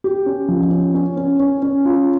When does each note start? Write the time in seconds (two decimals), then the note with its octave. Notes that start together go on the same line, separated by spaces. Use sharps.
0.04 G4
0.26 C#4
0.48 F3
0.71 C#4
0.94 C#4
1.17 C#4
1.40 C#4
1.62 C#4
1.85 F4